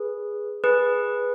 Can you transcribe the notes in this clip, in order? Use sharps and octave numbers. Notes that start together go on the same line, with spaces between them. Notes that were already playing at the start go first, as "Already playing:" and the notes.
Already playing: G#4 B4
G#4 B4